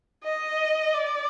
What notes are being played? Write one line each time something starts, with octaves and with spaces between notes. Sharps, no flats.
D#5
D5